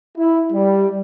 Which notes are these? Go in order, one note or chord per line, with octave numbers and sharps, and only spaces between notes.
E4
G3